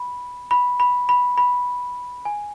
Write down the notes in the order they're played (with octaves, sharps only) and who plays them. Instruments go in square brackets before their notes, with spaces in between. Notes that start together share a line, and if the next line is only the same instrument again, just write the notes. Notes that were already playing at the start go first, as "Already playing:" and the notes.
Already playing: [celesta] B5
B5
B5
B5
B5
G#5